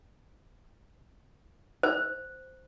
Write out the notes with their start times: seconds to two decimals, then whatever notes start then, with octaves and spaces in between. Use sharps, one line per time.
1.83 C5